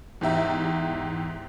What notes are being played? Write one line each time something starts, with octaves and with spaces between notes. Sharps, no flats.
E2 G#2 G4 E5 A#5